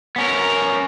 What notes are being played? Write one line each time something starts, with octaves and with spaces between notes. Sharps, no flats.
B3 C#4 A#4